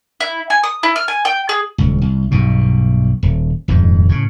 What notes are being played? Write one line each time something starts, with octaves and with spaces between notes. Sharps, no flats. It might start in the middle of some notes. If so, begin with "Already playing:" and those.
E4
G#5
D#6
E4
F6
G#5
G5
G#4
D#1 C#2
C2
B1 G2 B2
D#1
D#1 F2 G#2
A2 C#3